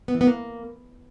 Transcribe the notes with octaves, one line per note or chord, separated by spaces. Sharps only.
B3
E3
B3
A#3